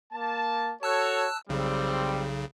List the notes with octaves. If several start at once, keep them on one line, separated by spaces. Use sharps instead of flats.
A#3 A5
F#4 A4 C#5 A5 E6 F#6
B1 C#3 G3 C4